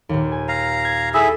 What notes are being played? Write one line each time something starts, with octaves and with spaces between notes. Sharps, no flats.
D#2 A#2
G#5
F5 A#5
G#6
E4 G#4 A4 E5